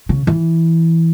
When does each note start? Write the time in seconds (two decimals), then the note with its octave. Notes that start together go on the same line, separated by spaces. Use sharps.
0.09 C#3
0.27 E3